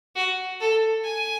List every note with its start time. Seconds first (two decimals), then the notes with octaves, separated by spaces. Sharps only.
0.16 F#4
0.60 A4
1.04 G#5